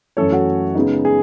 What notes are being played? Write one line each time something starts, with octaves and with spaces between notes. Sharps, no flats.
F#2 E3 A3 C#4 A4 C#5
F#4 A4
C#3 G#3 B3 D#4
G#4